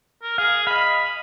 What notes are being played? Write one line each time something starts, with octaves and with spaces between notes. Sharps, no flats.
A#4
G#4 F5
D#5 F5 B5